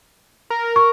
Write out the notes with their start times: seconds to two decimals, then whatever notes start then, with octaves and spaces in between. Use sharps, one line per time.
0.50 A#4
0.76 C#6